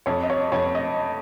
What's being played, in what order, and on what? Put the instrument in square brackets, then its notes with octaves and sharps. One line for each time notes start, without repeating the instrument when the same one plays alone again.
[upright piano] F2 C#5
D#5
C#5
F2 C#5
D#5